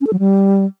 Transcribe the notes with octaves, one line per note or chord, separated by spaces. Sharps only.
C#4
A4
F#3
G3